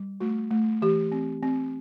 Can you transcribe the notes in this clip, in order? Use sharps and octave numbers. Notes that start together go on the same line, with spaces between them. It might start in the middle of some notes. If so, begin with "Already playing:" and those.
Already playing: G3
A3 F#4
A3
E3 G4
C4
C4